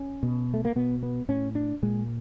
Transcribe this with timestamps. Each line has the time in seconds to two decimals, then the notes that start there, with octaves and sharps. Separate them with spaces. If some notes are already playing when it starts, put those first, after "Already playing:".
Already playing: C#4
0.23 B2
0.54 A3
0.65 A#3
0.76 B2 B3
1.03 B3
1.29 A2 C#4
1.55 D4
1.82 A#2 G#3